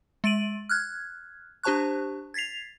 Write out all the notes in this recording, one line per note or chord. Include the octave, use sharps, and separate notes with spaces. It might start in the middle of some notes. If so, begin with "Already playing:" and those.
G#3 A6 D7 D#7 F#7
F6 F#6 G#6
D4 G4 C5 A5 C#6 F#6
G#6 A6 B6 C7 F7